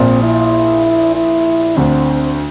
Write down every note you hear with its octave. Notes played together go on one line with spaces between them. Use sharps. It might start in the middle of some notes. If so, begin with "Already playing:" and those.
Already playing: A#1 A#2 C4
E4
E4
D2 D3 C4